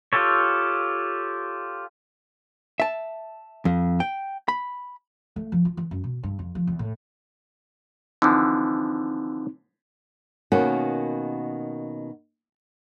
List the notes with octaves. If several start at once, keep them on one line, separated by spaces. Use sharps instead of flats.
F4 G4 A4 C#5
E5 A5
F2
G5
B5
A3
F3
F4
E3
F#2
B2
G2
F2
F3
E2
A2
D3 E3 F3 C4 D#4
B2 D#3 A#3 C#4 F#4